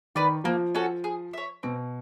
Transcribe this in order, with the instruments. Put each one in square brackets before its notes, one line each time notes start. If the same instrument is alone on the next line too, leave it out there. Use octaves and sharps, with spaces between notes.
[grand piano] D#3 [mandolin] B4 D5
[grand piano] F3 [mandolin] A#3
[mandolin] C#4 F#4 A4
G#4
C#5 E5
[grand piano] B2 [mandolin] C4